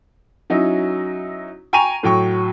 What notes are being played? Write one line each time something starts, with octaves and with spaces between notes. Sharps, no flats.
F#3 C#4 D#4 E4
G5 G#5 A#5 C#6 D#7 F7
A2 F#3 G5 C#6